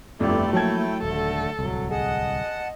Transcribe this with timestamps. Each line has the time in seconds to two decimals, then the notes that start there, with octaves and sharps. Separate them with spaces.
0.20 G1 F2 A3 E4 G4 D5
0.53 F3 F#3 A#3 E4 G5 A5 G#6
1.03 D#1 D3 A3 A4
1.59 D1 G1 C2 F#3
1.91 G#4 D#5 F#5 A5